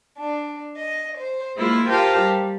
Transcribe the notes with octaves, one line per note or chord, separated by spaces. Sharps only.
D4
D#5
C5
G#3 A#3 E4 F4 C6
F4 G4 A#4 C5 F5 A5
G3